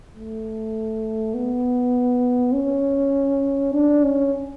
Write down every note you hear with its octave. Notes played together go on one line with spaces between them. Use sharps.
A3
B3
C#4
D4
C#4